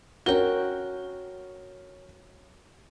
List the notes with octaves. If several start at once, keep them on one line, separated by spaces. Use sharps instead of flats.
C#4 F#4 A#4 G5 G7